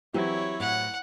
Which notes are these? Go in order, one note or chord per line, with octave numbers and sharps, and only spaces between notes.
E3 F#3 C4 E4 G4 C#5
A2 B4 F#5